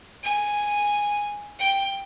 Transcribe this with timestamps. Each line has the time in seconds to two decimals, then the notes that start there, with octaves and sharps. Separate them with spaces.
0.24 G#5
1.59 G5